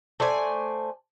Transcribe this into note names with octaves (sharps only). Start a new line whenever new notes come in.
A3 C5 D5 G#5